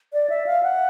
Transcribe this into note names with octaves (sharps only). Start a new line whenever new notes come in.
D5
E5
F5
F#5